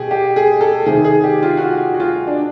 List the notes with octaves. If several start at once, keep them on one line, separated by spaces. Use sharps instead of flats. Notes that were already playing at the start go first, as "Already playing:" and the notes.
Already playing: B2 G4 G#4
G4
G#4
A4
C3 D#3 G#4
G#4
G4
F4
F#4
F4
F#4
F4
D4